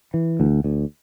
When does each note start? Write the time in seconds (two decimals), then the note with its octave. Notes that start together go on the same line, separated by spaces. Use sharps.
0.14 E3
0.40 D2
0.64 D2